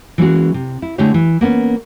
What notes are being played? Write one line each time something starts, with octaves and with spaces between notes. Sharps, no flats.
E3 G#3 A#3 C#4 F#4 G#4
C3
E4
D3 G#3 A3 E4 G4 C#5
E3
A#3 B3 C#4